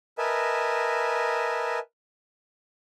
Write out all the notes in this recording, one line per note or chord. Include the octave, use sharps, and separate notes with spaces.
A#4 B4 D#5 E5 G#5 A5